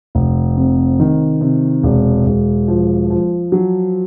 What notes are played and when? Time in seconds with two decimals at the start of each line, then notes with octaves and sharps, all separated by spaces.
0.15 F1
0.57 C3
1.00 D#3
1.41 C3
1.83 E1
2.26 E1
2.68 F3
3.10 F3
3.52 F#3